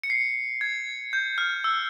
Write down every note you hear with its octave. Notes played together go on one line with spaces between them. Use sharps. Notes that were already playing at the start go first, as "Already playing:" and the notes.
C#7
C7
G#6
G6
F6
E6